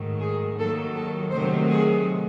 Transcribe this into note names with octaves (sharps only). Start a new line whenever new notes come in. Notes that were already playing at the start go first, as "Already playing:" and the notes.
Already playing: G#2 D#3 F#3 A3
G#4
D#2 D#3 F#3 A4
A4
C3 D#3 F#3 A3 C5
G#4